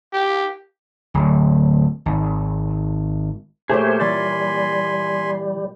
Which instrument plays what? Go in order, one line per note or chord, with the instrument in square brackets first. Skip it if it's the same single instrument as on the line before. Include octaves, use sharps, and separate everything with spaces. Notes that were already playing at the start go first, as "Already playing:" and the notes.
[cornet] G4
[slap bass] D1
G#1
[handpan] A#2 A#4 C#5 [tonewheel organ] A3 G4 C5 [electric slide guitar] G#4
[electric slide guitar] E3 D5 [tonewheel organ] G3 [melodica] G#5 B5 C6